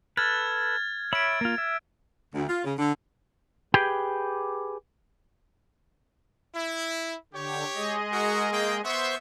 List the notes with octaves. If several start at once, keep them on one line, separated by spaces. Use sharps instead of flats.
A4 B4 F6 G#6 A6
C#5 E5 B5 G#6 D7
A#3 F4
E5
D2
F4
C#3
D3
G4 G#4 B4 G5
E4
D3 G4 C#5
G#3 G#4 D#5
F#4 A#4
A#3 G5
B3 C5 E5 C6 C#6